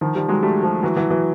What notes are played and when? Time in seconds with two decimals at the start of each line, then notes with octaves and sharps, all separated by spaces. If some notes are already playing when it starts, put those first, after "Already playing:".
0.01 D#3 F3
0.15 F3 G3
0.28 F#3 G#3
0.43 G3 A3
0.63 F3 G3
0.83 E3 F#3
0.96 E3 F#3
1.10 E3 F#3